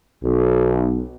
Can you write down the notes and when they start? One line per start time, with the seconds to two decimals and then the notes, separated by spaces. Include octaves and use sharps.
0.24 B1